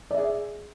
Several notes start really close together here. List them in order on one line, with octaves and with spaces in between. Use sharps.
D5 E5 G#4